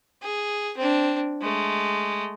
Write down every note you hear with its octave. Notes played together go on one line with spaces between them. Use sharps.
G#4
C4 D4
G#3 A3